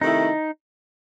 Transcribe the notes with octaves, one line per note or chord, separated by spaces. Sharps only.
C3 D#3 A3 D#4 E4